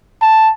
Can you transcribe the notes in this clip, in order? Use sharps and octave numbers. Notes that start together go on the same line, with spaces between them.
A5